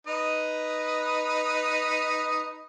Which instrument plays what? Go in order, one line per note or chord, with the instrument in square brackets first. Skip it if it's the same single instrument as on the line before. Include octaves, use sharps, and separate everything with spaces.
[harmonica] D#4 B4 D#5